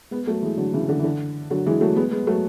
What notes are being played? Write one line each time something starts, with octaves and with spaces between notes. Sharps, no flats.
G#3 B3
F#3 A3
E3 G#3
D3 F#3
C#3 E3
D3
E3
D3
D3 F#3
E3 G#3
F#3 A3
G#3 B3
G#3 B3
F#3 A3